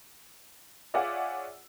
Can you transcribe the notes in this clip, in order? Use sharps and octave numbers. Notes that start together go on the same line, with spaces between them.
F4 G#4 C#5 D5 E5 F#5